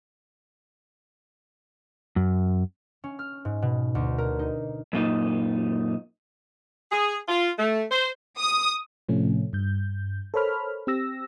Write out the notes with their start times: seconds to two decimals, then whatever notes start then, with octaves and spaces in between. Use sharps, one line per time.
2.16 F#2
3.04 C#4
3.19 F6
3.45 G#2
3.62 B2
3.95 D2
4.18 A#4
4.39 D#4
4.93 F#2 A#2 D#4
6.91 G#4
7.27 F4
7.56 A3
7.90 C5
8.39 D#6
9.08 A2 C3 F3 A3 C#4
9.53 G2 G6
10.34 A4 A#4 C5 C#5 B5 F6
10.87 C4 G4 E6 A#6